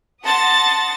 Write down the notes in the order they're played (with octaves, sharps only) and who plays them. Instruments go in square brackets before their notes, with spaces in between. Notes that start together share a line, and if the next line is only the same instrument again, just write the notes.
[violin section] F#5 A5 C6 D#6 A6 A#6